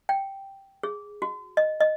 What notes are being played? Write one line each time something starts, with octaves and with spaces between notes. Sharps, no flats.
G5
G#4
F#4
D#5
D#5